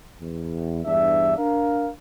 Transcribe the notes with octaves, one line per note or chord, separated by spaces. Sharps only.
E2
E2 G2 D4 E5
D4 A#4 F5